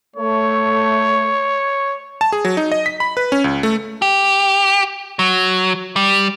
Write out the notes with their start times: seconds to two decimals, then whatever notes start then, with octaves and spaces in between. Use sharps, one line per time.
0.16 A3 C#5
2.21 A5
2.32 G#4
2.45 F#3
2.57 D#4
2.72 D#5
2.86 B6
3.00 B5
3.17 B4
3.32 C#4
3.44 C#2
3.63 A3
4.02 G4
5.19 F#3
5.96 G3